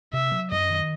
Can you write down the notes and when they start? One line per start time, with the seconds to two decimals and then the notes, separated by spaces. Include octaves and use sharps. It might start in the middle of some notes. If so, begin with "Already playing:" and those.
0.13 C3 E5
0.32 F#3
0.51 F#2 D#5
0.70 D#3